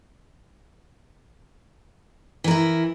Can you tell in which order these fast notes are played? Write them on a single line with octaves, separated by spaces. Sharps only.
E3 A#4 E4